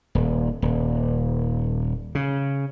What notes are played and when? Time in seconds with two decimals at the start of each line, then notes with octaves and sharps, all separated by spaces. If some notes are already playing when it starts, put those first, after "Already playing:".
0.15 D#1
0.62 D#1
2.15 C#3